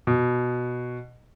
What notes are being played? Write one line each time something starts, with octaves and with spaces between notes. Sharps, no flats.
B2